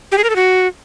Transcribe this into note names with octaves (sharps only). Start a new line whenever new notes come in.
G4
G#4
A#4
A4
F#4